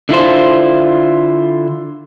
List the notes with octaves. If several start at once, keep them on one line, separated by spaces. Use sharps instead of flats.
D3 E4 F4 C5